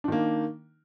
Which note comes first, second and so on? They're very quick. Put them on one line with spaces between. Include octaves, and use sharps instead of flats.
D4 D#3 A#3